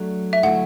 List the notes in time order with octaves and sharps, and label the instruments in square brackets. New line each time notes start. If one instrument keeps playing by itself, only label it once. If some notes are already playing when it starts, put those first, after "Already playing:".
Already playing: [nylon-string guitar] F#3 A3 D4
[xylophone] E5
[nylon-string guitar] D3 F#3 A3 E4 [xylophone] F#5